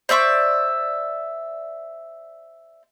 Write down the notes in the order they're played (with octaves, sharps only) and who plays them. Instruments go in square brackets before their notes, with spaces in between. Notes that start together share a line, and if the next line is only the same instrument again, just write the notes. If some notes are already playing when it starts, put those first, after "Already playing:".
[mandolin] C5 D5 E5 C#6